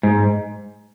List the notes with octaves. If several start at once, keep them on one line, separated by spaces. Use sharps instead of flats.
G#2